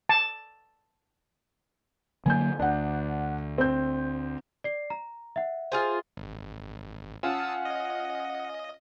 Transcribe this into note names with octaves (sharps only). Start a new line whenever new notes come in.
A5
D3 F#3 A#3 G#5 G6
D2 D4 F#5
C4 G6
D5 C7
A#5
E5 F#5
F4 G#4 C5
G#1
C#4 F4 F#5 A5 D#6 E6
D#5